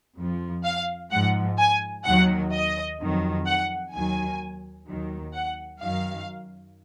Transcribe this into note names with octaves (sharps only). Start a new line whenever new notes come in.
F2 F3
F5
G#2 F3 F#5
G#5
D#2 D#3 F#3 F#5
D#5
F2 D#3 F#3
F#5
D#2 D#3 F#3 G#5
D#2 D#3 F#3
F#5
F#2 D#3 F#3 F5